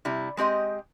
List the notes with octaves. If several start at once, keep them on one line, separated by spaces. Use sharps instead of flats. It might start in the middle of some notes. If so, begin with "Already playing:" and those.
C3 G3 E4
G#3 C4 G4 D#5